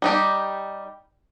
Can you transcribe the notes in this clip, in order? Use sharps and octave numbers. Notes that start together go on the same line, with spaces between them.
G3 D#4 G4